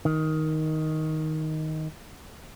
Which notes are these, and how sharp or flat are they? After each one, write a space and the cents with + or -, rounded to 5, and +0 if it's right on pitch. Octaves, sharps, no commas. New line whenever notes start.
D#3 +10